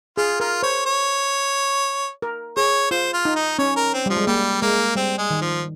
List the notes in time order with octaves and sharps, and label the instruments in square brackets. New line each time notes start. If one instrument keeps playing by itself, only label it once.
[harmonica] F4 [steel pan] G#4
[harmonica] F4 [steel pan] A#4
[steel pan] C5 [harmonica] C#5
[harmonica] C#5
[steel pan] A#4
[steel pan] G#4 [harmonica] C#5
[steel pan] F4 [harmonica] C5
[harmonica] F4
[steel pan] D#4
[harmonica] D#4
[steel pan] C#4 [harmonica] C#5
[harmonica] A#4
C4
[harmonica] F3 [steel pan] G3
[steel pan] G#3
[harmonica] G3 [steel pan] A#3
[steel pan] G#3 [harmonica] A#3
[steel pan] G3 [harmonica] C4
[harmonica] G#3
[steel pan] D#3
[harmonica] F3